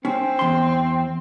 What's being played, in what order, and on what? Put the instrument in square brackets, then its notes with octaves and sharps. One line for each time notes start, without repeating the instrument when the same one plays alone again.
[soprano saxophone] C4 [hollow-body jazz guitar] C#4
[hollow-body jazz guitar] E2 C6